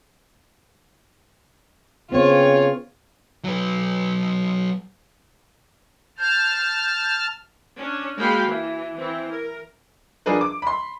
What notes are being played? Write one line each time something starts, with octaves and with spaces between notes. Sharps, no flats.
C#3 B3 C4 F4 C#5
F#3 B4
A5 F6 G6
C#4 D4
G#3 A#3 F#4 F5 G5 B5
E3
E3 C4
A#4
F3 D4 G#4 A#4 B4
D6
B5 C6